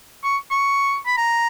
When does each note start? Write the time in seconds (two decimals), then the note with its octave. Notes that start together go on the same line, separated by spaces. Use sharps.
0.24 C#6
0.51 C#6
1.06 B5
1.17 A#5